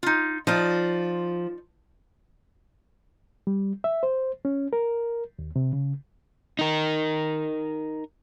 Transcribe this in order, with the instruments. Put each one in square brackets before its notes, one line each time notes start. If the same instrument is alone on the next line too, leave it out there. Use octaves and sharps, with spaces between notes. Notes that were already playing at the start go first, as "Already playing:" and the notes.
[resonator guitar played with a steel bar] D#4 F4
[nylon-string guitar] F3 [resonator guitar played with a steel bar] D#4 F4 D5
[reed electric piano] G3
E5
C5
C#4
A#4
D#2
C3
C#3
[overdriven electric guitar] D#4 A#4